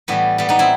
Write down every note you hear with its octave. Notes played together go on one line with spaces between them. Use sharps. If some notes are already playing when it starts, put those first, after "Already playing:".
A2 E3 G3 B3
G3 B3
B3 D#4
C4 E4